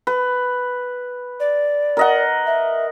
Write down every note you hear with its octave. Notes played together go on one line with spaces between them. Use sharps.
B4
D5
A#4 D#5 F#5
E5